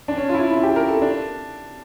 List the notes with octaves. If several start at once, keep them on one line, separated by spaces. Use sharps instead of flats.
D4
C#4
F4
E4
E4
G4
A#4
A4
D4